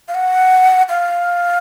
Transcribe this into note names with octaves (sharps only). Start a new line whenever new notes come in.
F5
F#5
F5